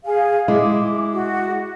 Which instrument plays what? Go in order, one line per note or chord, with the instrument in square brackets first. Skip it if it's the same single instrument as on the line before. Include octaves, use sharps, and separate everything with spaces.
[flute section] G#4 F5
[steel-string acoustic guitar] G#3 E4 [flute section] D6
[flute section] F#4